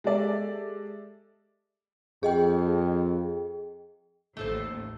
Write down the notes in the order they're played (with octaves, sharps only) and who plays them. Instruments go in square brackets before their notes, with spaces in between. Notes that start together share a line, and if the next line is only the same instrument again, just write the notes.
[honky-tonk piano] G#3 G4 A4 D5 E5
[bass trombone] F2 [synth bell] G#4 D#5 G5
[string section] A1 D#2 A2 [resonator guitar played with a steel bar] A3 A4 C5